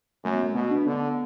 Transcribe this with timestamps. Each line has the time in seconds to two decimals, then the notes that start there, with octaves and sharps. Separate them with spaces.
0.24 F#2 A3
0.34 B3
0.44 A3
0.55 B2 B3
0.71 D4
0.86 D3 B3